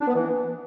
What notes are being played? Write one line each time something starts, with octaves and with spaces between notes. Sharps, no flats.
D4
B3
E3